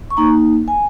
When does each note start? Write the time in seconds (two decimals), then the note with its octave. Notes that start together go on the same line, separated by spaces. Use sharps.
0.10 C#6
0.17 A#3 D#4 A#5
0.68 G#5